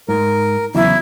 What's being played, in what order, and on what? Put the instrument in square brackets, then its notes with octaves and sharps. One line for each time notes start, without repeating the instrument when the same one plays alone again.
[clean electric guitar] G#2 [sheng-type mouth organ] A#4
[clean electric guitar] E2 C#3 F#3 [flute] E4